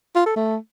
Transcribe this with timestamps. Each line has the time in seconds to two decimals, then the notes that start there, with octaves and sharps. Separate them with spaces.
0.15 F4
0.26 A4
0.36 A3